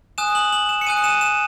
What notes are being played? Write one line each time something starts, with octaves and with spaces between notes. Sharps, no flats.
G#5 D#6 F#6 E7
F#7
F#7
E7
C#7
G#5 D#6 F#6 D#7
D#7
E7
E7